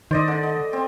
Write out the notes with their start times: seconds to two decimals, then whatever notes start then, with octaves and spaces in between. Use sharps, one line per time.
0.11 D#3 C5 D5 D#5
0.28 D3
0.43 D#5
0.73 C4